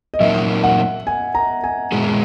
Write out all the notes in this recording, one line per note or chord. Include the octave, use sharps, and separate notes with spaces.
D#5
A#2 F#3 A#3 D#4 A#4 E5
F#5
G#5
A#5
G#5
A#2 G#3 B3 E4 G#4